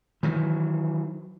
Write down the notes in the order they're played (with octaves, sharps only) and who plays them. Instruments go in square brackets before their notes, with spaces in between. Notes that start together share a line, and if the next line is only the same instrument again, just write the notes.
[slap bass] D#3 E3 F#3